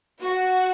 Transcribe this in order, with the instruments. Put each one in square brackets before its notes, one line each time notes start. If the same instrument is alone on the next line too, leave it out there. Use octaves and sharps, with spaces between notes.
[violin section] F#4